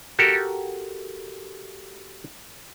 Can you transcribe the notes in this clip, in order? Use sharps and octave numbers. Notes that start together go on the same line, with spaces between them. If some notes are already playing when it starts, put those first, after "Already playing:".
F#4 G4 A4 A#4